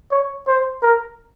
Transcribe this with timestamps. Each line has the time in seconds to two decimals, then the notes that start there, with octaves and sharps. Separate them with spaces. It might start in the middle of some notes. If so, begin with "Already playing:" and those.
0.11 C#5
0.47 C5
0.82 A#4